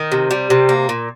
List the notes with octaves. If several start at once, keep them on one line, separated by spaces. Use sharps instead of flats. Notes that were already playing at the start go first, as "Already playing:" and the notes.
Already playing: D#3
C3
G3
C3
A#3
A#2